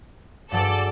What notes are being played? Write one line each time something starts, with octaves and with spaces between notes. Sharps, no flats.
G2 F#3 G#4 A4 D5